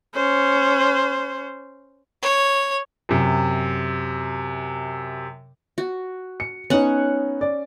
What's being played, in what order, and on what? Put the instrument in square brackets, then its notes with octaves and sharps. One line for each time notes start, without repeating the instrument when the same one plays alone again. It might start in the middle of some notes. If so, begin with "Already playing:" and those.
[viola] C#4 C5
[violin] C#5
[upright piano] F#2 C3
[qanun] F#4
[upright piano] C#7
[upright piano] B3 D#4 [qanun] C#4 F#5
[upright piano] D5